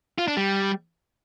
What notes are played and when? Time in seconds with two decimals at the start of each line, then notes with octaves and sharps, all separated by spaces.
0.18 F4
0.28 D4
0.37 G3